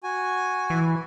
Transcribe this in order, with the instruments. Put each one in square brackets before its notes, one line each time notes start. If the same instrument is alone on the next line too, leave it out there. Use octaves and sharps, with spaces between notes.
[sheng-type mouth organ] F#4 G#5
[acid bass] E3